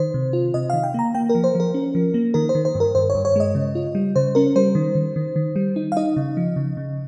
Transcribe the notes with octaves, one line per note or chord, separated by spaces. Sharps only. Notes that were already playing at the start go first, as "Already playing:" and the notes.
Already playing: D#3 C5
C3
F4
C3 D#5
D#3 F5
G5
A#3 A#5
A#3 G5
A#4
F3
C5
F3 A#4
C#4
F3
A#3
D#3 A#4
C5
D#3
C5
G2
A#4
G2 C5
C#5
G2
C#5
G#3 D#5
C#3
F4
G3
C#3 C5
C#4 A#4
G3 C5
D#3
D#3
D#3
D#3
G3
D#4
F5
D#4 D#5
C#3
F3
C#3
C#3